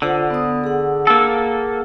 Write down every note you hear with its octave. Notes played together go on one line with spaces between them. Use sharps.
D3 F4 C5 F#5
B3 D#6
G#4 F#5
A#3 A4